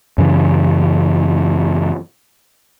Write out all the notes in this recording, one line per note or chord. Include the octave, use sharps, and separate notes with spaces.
F#2 C#3 E3